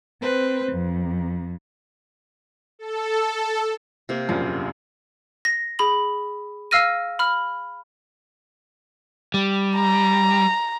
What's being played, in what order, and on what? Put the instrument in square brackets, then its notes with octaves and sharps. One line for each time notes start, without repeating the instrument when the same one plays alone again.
[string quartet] C4 B4 C5
F2
[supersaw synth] A4
[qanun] C3 A#3
[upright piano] E1 A#1 F#2 [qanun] F3
[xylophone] A#6
G#4 B5 F#7
F5 E6 F6 A#6 D#7
B5 F6
[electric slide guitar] G3
[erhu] A#5